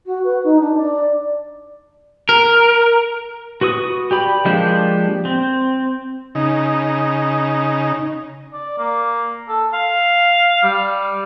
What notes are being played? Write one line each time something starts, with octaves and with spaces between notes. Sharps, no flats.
F#4
B4
D#4
D4
D5
A#4
F#4 B4 C#6 D#6
G4 D5 B5
F3 G#3 A#3 D4 G4
C4
C#3 D#4
D5
A#3
A4
F5
G3